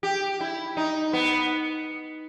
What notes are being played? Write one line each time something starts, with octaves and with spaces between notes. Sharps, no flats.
G4
E4
D#4
B3